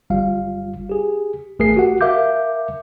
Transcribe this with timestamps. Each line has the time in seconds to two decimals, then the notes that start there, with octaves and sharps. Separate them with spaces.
0.10 G1 G3 F4 F5
0.89 G4 G#4
1.59 G#1 A3 G#4 A#4 C7
1.76 F#4 G4 F#5
2.01 A#4 E5 F5 D6 G6